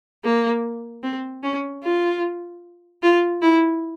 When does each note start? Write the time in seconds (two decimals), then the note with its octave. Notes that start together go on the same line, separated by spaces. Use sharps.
0.25 A#3
1.03 C4
1.43 C#4
1.84 F4
3.03 F4
3.42 E4